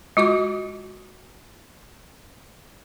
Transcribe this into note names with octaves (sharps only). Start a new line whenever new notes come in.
G#3 F4 F#4 D6